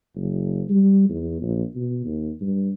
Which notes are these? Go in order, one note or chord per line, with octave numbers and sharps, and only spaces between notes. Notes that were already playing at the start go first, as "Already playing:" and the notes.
F#1
G3
E2
A#1
B2
D#2
G2